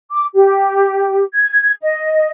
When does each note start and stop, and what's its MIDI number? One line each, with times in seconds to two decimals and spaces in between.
0.11 0.26 86
0.35 1.23 67
1.34 1.73 92
1.82 2.31 75